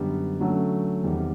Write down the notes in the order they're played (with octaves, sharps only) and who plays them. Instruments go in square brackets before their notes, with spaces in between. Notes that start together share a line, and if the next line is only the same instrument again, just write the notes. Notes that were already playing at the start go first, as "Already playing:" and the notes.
Already playing: [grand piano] F#2 D3 G3 B3
D3 F#3 A3 C#4
E2 C3 D#3 G3